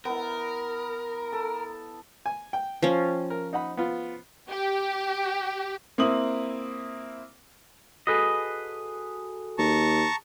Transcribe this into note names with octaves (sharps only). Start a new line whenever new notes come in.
B3 E4 A#4
A4
G#5
G5
F3 C#4
A#4
D#4 F#5 B5
B3 F4
G4
A#3 C4 E4 D#6 F#7
F#4 G#4 A4 B4 D#5
D#2 A5 A#5 C#6